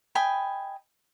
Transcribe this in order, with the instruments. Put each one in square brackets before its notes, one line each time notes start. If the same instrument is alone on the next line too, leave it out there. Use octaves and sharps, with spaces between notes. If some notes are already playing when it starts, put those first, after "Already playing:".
[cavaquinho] D#5 G5 G#5 B5